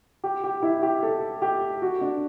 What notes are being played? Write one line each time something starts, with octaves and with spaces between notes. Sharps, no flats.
G4
G4
E4
G4
A4
G4
F#4
D4